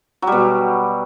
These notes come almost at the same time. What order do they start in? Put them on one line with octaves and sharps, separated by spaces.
F#3 G3 B2